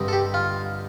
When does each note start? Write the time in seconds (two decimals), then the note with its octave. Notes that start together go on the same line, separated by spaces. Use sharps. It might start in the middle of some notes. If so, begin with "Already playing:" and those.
Already playing: G2 D3 G3 C4 D#4
0.08 A4
0.13 G4
0.34 F4